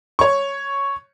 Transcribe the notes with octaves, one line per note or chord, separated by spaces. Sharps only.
C#5 C#6